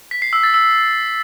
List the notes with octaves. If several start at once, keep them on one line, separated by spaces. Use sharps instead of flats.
B6
C7
E6
A6
E6